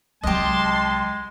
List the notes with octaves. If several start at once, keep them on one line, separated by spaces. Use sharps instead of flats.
C2 F#3 G#3 G4 D#5 A5 C6